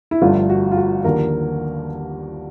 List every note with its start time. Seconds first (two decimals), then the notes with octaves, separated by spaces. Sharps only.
0.11 E4
0.21 G1 G2 D3 F3 A3 F4
0.50 F#4
0.72 F4
0.77 F#4
1.04 D#2 D3 F3 A#3 A#4